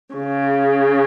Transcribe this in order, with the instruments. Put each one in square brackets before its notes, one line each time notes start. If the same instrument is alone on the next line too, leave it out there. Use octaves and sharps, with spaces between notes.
[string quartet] C#3